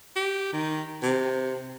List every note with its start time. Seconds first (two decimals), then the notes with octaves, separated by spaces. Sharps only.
0.16 G4
0.53 D#3
1.03 C3